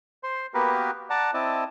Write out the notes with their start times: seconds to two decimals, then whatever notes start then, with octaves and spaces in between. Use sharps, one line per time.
0.23 C5 C6
0.54 A#3 B3 F#4 G4 A#4 B4
1.10 D5 F#5 A5 A#5
1.34 C4 E4 D5 D#5 A5